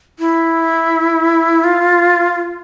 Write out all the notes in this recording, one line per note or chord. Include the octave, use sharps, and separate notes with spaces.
E4
F4